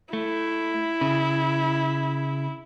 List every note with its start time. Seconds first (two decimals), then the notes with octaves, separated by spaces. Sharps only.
0.13 A3 E4
1.01 C#3